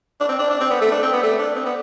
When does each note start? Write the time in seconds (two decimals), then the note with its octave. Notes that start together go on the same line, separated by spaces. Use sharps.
0.20 D4
0.29 C4
0.39 D4
0.50 D4
0.60 C4
0.70 B3
0.81 A3
0.92 D4
1.03 C4
1.13 B3
1.23 A3
1.39 D4
1.55 C4
1.65 B3